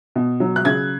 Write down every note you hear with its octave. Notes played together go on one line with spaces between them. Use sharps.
B2
F#3
F#6
C#3 G#6